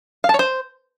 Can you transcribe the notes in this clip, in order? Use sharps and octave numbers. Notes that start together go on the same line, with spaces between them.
F5
A5
C#5
C5